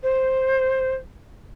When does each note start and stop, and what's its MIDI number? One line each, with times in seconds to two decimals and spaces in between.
0.03 0.95 72